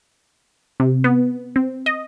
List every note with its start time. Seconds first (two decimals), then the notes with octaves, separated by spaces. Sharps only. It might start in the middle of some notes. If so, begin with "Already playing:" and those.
0.80 C3
1.04 B3
1.56 C4
1.86 D#5